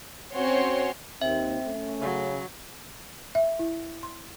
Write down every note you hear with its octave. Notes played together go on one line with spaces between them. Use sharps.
C4 C#4 F#4 C#5 C6
D#2 C4 E5
A3 C#4
C#3 F#3
E5
E4
C6